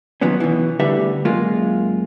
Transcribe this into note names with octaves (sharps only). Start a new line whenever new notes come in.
D#3 F3 F#3 B3 C#4
B2 E3
D2 D3 G3 G4 B4 E5
F#2 G#3 A#3 F4